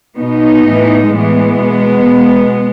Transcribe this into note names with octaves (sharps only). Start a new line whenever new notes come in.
B2 B3 D#4
A2 E3
A2 E3 G#3 B3
B2
B2